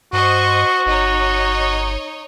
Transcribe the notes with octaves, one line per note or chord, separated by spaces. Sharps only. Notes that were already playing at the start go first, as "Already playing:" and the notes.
G2 F#4 C5 D#5 C#6
G1 D#4 C#5